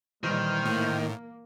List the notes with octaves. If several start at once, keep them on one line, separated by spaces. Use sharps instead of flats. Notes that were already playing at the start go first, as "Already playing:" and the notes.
A#2 D#3 E3 G3 C5 F6
A2 A#3